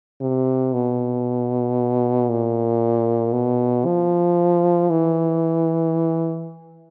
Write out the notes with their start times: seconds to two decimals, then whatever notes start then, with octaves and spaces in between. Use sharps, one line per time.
0.21 C3
0.73 B2
2.29 A#2
3.33 B2
3.86 F3
4.90 E3